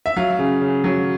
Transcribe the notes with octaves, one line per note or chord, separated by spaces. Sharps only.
E5
F#3 F5
C#3
C#3
F#3